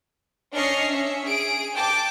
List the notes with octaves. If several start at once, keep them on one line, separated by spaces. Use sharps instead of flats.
C#4 D4 D#5 C#6 F6 C7
C#4 E5
G#4 D7
G5 A5 D6